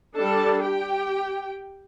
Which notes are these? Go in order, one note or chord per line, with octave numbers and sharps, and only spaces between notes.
G3 D4 A4 A5
G4 G5